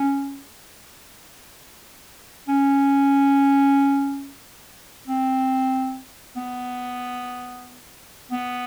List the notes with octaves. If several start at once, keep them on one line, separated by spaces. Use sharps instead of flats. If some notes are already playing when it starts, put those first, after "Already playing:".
Already playing: C#4
C#4
C4
B3
B3